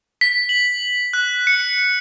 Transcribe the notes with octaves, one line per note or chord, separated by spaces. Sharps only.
B6
F#7
F#6
C#7